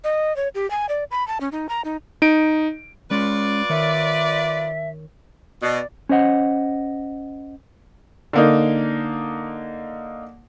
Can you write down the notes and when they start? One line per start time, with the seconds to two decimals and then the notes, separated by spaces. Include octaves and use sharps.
0.04 D#5
0.36 C#5
0.55 G4
0.71 G#5
0.89 D5
1.11 B5
1.28 A5
1.41 C#4
1.52 D#4
1.69 A#5
1.85 D#4
2.22 D#4 D7
3.11 G#3 C#4 F4 B4 D5
3.69 D#3 A#4 C#5 E5
5.62 B2 D5
6.09 C#4 C5 D#5 F#5
8.33 D3 A#3 D#4